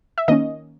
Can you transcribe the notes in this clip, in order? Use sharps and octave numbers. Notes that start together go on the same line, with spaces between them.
E5
D#3 A#3 C#4 D#5